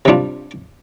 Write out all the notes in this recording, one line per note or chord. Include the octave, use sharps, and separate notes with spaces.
C3 G3 D4 F4